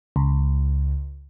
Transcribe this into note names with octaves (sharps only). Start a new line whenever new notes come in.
C#2